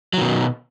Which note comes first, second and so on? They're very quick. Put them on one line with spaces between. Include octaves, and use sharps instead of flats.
F#3 D#3 B2